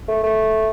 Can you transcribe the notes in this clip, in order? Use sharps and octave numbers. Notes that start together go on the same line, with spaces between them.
A3
A3